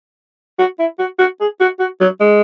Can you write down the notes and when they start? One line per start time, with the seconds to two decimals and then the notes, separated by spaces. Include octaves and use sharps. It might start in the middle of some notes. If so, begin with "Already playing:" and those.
0.59 F#4
0.80 E4
0.99 F#4
1.19 F#4
1.40 G#4
1.60 F#4
1.80 F#4
2.01 F#3
2.20 G#3